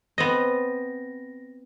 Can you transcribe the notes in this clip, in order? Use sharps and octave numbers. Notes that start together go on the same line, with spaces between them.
B3 C4 D#5 A#6